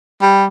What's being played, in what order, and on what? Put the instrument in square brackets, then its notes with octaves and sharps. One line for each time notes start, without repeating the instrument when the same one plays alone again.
[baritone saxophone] G3